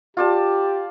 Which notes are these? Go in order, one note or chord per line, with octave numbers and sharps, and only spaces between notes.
F4 G4 D5 A5